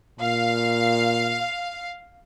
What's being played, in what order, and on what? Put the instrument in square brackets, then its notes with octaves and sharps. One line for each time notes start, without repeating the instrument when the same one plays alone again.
[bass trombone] A#2 [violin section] F5